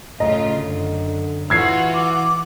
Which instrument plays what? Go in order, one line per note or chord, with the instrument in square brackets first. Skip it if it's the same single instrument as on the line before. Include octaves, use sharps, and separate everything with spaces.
[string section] A2 C#3 F4 [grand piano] D#5 A#5
[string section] F#2 [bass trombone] D3
[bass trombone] E3 [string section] F4 F#4 [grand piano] E6 G#6 C7
[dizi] D6